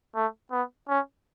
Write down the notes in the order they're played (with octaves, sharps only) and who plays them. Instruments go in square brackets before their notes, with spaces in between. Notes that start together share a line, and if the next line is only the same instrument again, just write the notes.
[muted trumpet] A3
B3
C#4